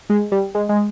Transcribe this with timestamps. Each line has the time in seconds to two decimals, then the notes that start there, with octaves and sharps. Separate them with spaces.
0.10 G#3
0.32 G3
0.55 G#3
0.69 G#3